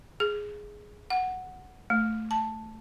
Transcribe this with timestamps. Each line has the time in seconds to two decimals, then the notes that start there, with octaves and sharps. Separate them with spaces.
0.20 G#4
1.10 F#5
1.90 A3
2.31 A5